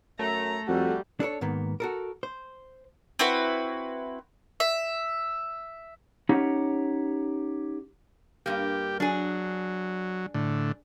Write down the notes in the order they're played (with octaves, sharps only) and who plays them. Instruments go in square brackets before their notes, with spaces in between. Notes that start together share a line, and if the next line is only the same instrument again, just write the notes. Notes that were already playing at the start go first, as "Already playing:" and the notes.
[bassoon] F#2 [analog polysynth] A3 [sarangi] A#5
[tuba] F2 [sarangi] G3 [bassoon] F#4
[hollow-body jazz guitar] D4 A4 A#4 C#5
G#2 D#3 A#3 B3
F#4 A4 A#4
C5
[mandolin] C4 E4 F#4 B4
E5
[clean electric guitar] C#4 D#4 G4 C#5 F#5
[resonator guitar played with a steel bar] G2 A#3 [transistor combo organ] G4
[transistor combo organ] F#3 [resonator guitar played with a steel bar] D4 G#4
[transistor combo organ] A2 D3